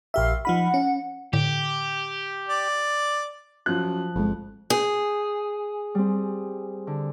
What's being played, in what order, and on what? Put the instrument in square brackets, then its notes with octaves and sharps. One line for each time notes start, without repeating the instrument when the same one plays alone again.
[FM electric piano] A#1 G4 E5 [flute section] F5 F6
[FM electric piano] F3 D#4 B5 [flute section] F#5
[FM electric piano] C#4
[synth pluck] A2 D3 [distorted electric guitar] G4
[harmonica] D5
[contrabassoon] F#2 [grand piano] F3 F#6
[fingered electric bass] G1 C3 G#3 [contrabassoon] F2
[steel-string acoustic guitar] G#4 [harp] G6
[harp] G3 C4
D3